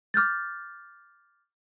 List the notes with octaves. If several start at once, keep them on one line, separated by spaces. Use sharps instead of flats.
D6 F6 G6 A6